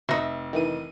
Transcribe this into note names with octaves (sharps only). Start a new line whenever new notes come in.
F1 D#4 E5 A#6
D#3 E3 D#7